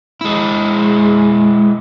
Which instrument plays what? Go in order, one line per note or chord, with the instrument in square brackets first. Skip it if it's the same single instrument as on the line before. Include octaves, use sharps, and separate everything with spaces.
[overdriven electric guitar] G#3 E4